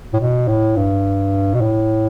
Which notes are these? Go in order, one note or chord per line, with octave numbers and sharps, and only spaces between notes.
A2
B2
A2
G2
B2
A2